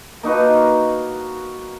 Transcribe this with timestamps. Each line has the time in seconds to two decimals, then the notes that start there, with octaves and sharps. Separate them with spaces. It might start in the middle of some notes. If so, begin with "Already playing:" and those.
0.23 A#3 D#4 F#4 B4